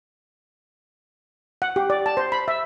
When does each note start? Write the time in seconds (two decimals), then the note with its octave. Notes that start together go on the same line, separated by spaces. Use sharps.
1.62 F#5
1.76 G4
1.90 D5
2.06 A5
2.17 C5
2.32 B5
2.48 E5